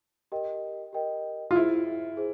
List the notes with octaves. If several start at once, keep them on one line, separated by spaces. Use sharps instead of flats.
G4 A#4 D#5 G5
G4 A#4 D#5 G5
F4
E4 G#4 C5 E5
G#4 C5